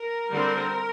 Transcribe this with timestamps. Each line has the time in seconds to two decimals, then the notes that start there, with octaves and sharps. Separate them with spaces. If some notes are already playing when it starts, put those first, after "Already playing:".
Already playing: A#4
0.32 D3 G3 C4